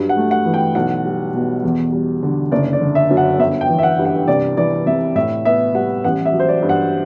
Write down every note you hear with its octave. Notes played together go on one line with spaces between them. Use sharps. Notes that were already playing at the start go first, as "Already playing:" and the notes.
Already playing: G2 F#3
F#5
A3
F#5
E3
G5
B1 F#5
G3
B2
E2
G3
D3
F#1 D5
D5
D3
E5
F#2
F#5
G1 E5
G5
E3
E5
F#5
G2
F#5
C2 D5
E3 D5
C3 E5
A2 E5
B3 E5
G3 F#5
A1 F#5
E5
F#3
C5
D5
G2
F#5